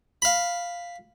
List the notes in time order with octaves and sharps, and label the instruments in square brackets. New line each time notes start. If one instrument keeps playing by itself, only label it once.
[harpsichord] F5 B5